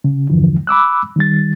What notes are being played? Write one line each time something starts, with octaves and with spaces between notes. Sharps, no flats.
C#3
E2 G2 D3 E3 F3
B5 D6 E6 F#6
D#3 G3 A6